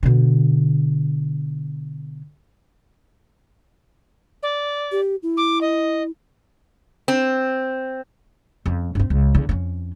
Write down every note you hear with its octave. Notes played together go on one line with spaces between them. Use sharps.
B2 D3
D5
G4
E4
D6
D#5
C4
F2 C#4
G2 C4
C#2
E2 D3
F2 C#4